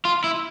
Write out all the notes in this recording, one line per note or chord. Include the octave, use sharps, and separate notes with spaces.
F4
E4